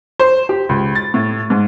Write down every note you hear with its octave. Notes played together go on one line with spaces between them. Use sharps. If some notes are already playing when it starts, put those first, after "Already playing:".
C5
G4
C#2
A6
A2
G#2